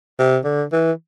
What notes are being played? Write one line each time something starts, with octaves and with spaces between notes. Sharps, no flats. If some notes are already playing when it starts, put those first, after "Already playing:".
C3
D3
E3